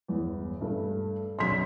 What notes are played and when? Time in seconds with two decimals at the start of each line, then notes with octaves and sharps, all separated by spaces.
0.08 G1 E2
0.61 G2 A3
1.39 B1 F#2 B2 C6 B6